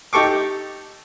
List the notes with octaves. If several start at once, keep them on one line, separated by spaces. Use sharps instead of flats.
D#4 G4 A4 C#6 D6